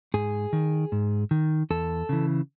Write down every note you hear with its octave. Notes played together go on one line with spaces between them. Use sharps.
G#2 G#4
D#3
G#2
D#3
E2 A4
C#3 E3